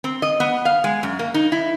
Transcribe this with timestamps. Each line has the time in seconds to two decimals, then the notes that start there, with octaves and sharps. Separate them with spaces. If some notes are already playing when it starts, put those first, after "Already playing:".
0.04 C4
0.22 D#5
0.40 B3
0.65 F5
0.84 G#3
1.03 F#2
1.19 A#3
1.34 D#4
1.52 E4